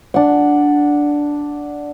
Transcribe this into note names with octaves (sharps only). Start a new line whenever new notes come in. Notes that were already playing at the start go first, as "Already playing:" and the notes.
D4 F#5